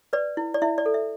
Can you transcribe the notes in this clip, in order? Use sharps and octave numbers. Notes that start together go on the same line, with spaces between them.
B4 D5
E4
D5
E4 E5
D5
A4
E5